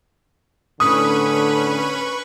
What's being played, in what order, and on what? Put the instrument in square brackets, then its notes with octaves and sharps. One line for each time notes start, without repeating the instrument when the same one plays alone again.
[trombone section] A2 D3 [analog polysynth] C#4 B5 D#7 [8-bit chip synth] B4 C#6 [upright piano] D#6